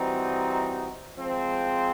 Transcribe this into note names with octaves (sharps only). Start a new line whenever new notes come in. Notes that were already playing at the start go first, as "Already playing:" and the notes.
Already playing: E3 G3 C4 D#4 F#4
F3 G#3 C4